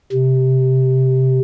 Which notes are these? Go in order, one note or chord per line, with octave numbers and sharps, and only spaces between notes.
C3